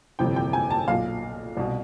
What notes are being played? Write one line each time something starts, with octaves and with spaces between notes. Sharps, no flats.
G1 F2 C3 E3 G5
G5
G#5
A5
B1 A#2 F5
C2 B2